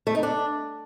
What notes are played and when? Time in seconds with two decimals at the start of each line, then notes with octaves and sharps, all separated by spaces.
0.07 A3
0.15 D#4
0.23 D4